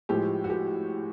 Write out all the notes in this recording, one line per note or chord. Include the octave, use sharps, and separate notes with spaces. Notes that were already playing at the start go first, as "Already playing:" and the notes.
A2 F3 G#3 G4
F#4
G4